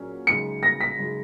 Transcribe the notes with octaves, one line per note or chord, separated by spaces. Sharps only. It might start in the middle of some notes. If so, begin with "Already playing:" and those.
Already playing: A#2 F#3 C#4 G#4
F#2 C#3 G#3 D#4 G#4 C#7
A#6
B6
F#2 C#3 G#3 D#4 G#4